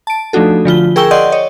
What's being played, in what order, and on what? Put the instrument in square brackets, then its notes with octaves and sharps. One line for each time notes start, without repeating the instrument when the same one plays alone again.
[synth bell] A5 D7
F3 A3 D4 D#4 F#4 A4
D3 F3 F4 G7
G#4 A#4 G5 C#6 E6 G7
D5 D#5 F#5 C6 G6
C#5 D#5